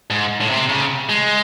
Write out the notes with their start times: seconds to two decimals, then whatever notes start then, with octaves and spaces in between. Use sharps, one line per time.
0.10 G#2
0.41 A2
0.50 C3
0.69 C#3
1.09 G#3